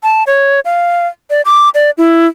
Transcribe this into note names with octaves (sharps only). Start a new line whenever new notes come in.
A5
C#5
F5
D5
D6
D5
E4